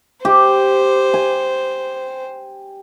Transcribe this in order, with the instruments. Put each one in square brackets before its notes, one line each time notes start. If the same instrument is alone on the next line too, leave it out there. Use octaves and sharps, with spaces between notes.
[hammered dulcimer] G4 [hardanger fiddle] C5
[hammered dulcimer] G#5